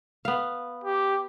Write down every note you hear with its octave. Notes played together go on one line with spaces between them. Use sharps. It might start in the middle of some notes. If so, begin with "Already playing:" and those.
B3 F5
G4